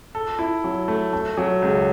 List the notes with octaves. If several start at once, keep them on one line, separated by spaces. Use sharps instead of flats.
A4
E4
F#3
A3
A3
F#3
C#2